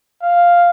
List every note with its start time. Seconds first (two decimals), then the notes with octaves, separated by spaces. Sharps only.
0.23 F5